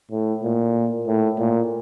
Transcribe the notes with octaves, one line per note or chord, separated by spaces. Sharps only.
A2
A#2
A2
A#2